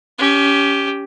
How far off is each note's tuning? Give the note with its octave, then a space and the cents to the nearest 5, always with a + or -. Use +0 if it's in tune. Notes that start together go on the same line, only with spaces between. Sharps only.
C#4 +25 G4 +0